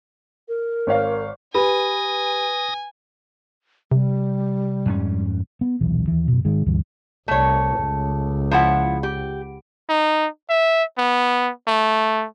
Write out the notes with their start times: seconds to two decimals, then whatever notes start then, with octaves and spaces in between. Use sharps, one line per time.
0.48 A#4
0.87 G#1 C#5 F5
1.54 G4 B4 G#5 B5 D#6 A#6 D#7
3.92 C3 G3
4.86 F2 G#2 C#4
5.61 B3
5.81 D#1 B1 E3
6.08 D#2 E3
6.28 F#2 B2
6.45 G#2 D#3 G#3
6.66 D2 G2 E3
7.28 C2 A3 C#5
7.82 C#2
8.51 F3 E4 F#5
9.03 G4
9.89 D#4
10.50 E5
10.98 B3
11.67 A3